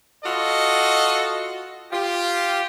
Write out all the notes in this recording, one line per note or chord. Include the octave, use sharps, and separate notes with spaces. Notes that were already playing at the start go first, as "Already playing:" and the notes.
F4 F#4 A4 D#5
F4 G4